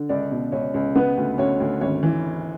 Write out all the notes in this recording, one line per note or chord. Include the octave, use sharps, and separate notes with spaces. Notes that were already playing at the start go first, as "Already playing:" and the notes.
Already playing: D3
C#2 D4 D5
B2
C#2 C#4 C#5
C#2
C#3 B3 B4
D2
D2 C#4 C#5
D2
G#1 C#4 C#5
E3